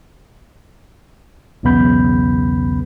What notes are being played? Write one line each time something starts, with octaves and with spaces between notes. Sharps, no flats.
B1 E2 C#3 B3 B5 G6